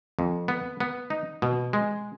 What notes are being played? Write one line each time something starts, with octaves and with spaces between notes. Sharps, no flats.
F2
B3
B3
D#4
B2
G#3